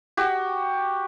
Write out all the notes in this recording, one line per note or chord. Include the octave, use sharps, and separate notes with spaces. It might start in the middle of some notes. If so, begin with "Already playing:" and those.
F#4 G4